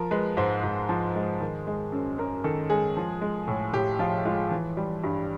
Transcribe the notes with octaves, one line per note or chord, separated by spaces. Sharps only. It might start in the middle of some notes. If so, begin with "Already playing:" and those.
Already playing: F3 A#4
G#3 B4
G#2 C5
G#2
F3
G#3
D#3
G#3
F#2
F#2 A#4
D#3 A4
G#3 G#4
F3
G#3
A2
A2 G4
F3 F4
G#3 F4
E3
G3
G2